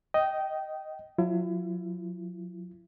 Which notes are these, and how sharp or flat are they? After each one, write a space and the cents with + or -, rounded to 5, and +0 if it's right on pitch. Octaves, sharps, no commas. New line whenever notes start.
D#5 +5 G5 -20
F#3 -35 E4 +35